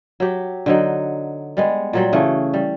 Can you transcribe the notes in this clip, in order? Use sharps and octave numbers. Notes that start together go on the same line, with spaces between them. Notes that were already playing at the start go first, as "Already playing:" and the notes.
F#3 G4
D3 F#3 D#4
G3 G#3 B3
A#2 F#3 G3
C#3 E3 A3
G3